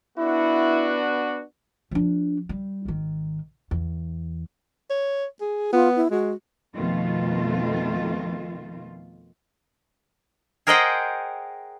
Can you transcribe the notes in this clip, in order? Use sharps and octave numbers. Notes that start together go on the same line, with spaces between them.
B3 D4 E4 F#4
F3 D4
G3
G#1 D#3
E2
C#5
G#4
B3 F4
E4
G#3 F#4
F2 B2 D#3 A3 F4
G#4 A#4 C5 D#5 F#5 G5